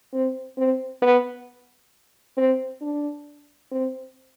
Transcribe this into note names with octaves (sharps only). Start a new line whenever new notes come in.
C4
C4
B3
C4
D4
C4